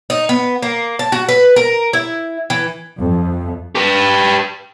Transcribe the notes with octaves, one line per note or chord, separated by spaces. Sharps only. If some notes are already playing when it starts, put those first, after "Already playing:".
D#4
B3
A#3
A5
F#4
B4
A#4
E4
E3
F2
G4 B4